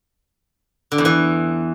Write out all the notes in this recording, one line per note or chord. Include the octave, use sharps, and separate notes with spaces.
D3
E2
E3